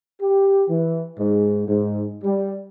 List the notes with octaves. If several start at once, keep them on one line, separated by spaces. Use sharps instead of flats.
G4
E3
G#2
G#2
G3